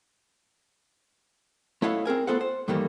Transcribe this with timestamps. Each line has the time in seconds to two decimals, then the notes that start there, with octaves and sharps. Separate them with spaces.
1.82 A3 E4 C#5 D#5 F5 F#5
2.05 C4 G#4 A#4 G#5
2.27 A3 B3 F4 A4 C5 F#5
2.41 C5
2.68 G2 D#3 E3 G3 A3 A#3